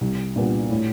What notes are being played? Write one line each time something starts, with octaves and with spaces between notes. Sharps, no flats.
C2
A#2 G3 B3 D4
A2